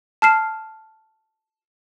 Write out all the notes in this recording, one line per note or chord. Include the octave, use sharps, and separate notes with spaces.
A5 F6 C7 E7